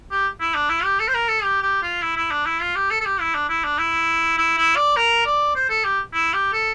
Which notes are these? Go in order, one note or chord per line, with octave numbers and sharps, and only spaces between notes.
G4
E4
D4
E4
G4
A4
C5
A#4
A4
G4
G4
F4
E4
E4
D4
E4
F4
G4
A4
A4
G4
E4
D4
E4
D4
E4
E4
E4
D5
A#4
D5
C5
A4
G4
E4
G4
A4